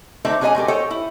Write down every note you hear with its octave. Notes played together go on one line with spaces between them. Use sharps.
D3 A3 C4 D#4 C5 E5
F#3 C#4 G#4 A#4 D#5 G#5
G#3 A3 G4 A#4
A4 C5 C#5 D#5 G5
E4